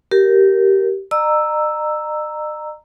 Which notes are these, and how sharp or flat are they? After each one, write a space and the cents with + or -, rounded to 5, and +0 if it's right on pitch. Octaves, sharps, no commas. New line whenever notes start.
G4 -15 A#4 +0
D#5 -45 A#5 -5 E6 +0